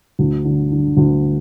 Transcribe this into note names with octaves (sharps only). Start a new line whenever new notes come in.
D2
D3
D3
D2